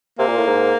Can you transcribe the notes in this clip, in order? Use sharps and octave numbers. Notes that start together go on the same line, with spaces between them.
C3 A#3
A#2
A2
G#2